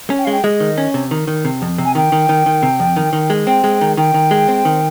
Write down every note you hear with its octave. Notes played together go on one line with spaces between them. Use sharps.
C#4
G5
G#3 F5
G5
G#3 D#5
D#3
C#4
C3
D#3
D#3
C3
F2
C3
G#5
D#3 G5
D#3
D#3
D#3
C3
F2
D#3
D#3
G#3
C4 G5
G#3
D#3
D#3 G5
D#3
G#3
C4
D#3